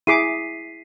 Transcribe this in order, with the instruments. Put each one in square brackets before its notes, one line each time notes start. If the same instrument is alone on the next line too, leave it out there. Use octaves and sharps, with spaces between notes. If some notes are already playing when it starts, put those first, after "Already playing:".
[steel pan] E4 G#4 D6 [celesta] B6 C7 D#7